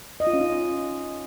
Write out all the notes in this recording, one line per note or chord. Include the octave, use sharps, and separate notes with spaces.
D#5
F4
C#4
D#4